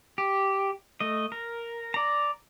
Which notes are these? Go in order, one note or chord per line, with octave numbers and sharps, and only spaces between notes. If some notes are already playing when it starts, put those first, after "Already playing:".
G4
A3 D#5
A#4
D5 A#5